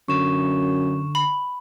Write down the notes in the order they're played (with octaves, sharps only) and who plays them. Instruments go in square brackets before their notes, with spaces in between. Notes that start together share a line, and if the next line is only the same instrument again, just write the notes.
[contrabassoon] F#2 [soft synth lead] D3 [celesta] C#6 E7
[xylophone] B5